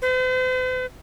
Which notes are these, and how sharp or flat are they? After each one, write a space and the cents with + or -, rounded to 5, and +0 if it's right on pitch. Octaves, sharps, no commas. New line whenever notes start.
C5 -45